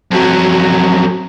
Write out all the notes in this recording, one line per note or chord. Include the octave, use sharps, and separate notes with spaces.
F2 F#3